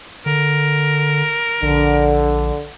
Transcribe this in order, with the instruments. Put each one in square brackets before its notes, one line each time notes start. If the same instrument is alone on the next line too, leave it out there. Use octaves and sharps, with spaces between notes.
[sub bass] D3 [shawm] A#4
[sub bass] A#1 [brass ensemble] D3